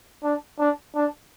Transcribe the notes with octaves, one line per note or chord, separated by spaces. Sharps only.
D4
D4
D4